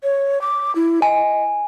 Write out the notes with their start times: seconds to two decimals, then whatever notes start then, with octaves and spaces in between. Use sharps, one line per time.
0.03 C#5
0.41 D6
0.75 E4
1.02 D#5 G#5